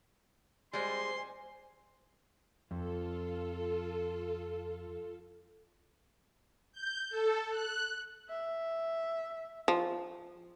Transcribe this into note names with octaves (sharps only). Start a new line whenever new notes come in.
G3 G#3 C5 G#5 C6
F2 F4 A4
G6
A4
F#6
E5
F3